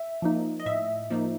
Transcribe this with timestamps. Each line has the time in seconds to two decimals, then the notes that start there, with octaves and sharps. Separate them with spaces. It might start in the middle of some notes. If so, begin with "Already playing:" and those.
Already playing: E5
0.22 F3 A#3 D#4
0.60 D#5
0.66 A2 E5
1.10 F3 A#3 D#4